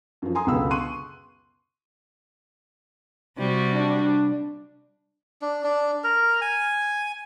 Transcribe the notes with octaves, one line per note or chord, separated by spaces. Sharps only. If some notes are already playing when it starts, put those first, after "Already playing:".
F#2 F3
G#5 A#5 C6 D#6
C#2 F#2 B2 D3 B5 E6
C6 C#6 F#6 D#7
C3 G3 F#4
D4
D4
D4
A#4
G#5